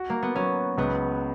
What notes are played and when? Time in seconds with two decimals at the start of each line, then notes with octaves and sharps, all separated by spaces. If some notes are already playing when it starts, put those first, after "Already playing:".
Already playing: F#4
0.10 A#3
0.22 B3
0.35 F#3 C#4
0.78 C#2 B3